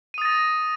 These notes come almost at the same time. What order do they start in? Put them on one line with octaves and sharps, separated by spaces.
D#7 D#6 A6 A#6